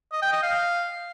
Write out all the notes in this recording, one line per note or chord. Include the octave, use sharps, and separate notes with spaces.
D#5
G5
D#5
F5